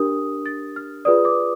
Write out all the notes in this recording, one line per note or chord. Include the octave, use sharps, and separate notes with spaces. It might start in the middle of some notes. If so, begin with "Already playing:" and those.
Already playing: D4 G4 A#4 D#6
A6
F6
F4 G#4 B4 D5 D#6
D6